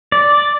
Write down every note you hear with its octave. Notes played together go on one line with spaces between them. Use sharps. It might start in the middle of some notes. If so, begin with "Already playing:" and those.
D5